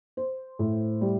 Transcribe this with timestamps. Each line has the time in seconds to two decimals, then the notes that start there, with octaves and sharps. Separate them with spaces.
0.17 C5
0.59 A2
1.01 G3